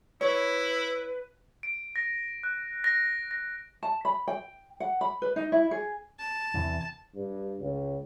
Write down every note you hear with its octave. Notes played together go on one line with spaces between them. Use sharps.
E4 B4 C#5
D7
A#6
F#6
A#6
A#6
A5
B5
G5
F#5
B5
B4
D#4
E4
G#4
A5
E2 C3 E3
G2
C#2